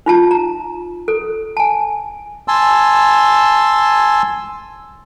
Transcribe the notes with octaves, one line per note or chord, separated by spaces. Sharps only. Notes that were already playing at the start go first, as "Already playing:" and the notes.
D#4 F4 A5
A#5
A4
G#5 A5
G#5 A5 C6 E6